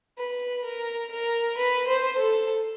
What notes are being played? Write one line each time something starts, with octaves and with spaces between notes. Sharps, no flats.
B4
A#4
A#4
B4
C5
A4